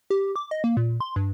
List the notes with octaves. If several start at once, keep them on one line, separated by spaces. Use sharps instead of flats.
G4
D6
D#5
A#3
A#2
C6
G2